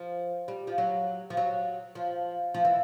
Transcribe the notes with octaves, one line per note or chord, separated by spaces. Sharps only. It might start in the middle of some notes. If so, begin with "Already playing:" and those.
Already playing: F3
G3
F3
F#3
F3
F#3
F3
F3
E3